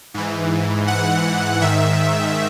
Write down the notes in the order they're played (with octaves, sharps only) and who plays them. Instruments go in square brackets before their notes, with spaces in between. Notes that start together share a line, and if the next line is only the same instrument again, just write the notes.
[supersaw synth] G#2 E3
F#5
G#2 D#3 E5